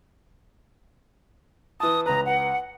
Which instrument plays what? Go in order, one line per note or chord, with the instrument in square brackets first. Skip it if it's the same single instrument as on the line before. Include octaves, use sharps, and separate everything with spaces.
[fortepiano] E3 A5 [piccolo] D#6
[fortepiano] C#2 B4 [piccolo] A#5
[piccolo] F#5